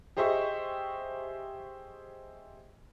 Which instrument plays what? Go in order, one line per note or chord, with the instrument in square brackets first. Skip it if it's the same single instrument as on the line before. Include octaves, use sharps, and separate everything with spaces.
[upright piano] G4 G#4 C5 D#5 E5 C#6